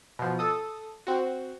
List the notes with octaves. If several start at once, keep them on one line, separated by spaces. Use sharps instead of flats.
B2 F3
A4 D#6
C4 F#4